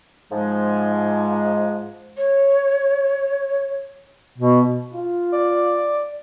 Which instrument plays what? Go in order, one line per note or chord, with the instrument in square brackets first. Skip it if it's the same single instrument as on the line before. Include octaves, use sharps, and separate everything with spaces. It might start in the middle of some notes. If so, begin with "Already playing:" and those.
[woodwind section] G#2 F3 G#3
[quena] C#5
[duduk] B2
[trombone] F4
[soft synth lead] D5